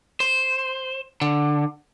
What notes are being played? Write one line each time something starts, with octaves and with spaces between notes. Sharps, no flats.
C5
D3